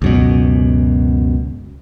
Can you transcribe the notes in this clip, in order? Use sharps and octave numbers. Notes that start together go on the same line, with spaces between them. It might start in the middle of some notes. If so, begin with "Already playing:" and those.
C#2 F#2 B2